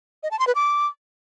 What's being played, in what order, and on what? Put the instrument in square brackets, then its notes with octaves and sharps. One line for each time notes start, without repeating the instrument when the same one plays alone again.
[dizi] D#5
A5
C6
B4
D6